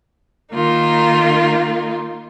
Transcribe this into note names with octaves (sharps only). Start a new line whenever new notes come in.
D#3 A#3 D#4 F4